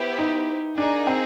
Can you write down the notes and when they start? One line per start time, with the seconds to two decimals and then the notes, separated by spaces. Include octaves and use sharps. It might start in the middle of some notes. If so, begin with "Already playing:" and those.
Already playing: B3 E4 G4 C5
0.19 D#4
0.77 A#3 D4 D#4 G#4
1.07 C4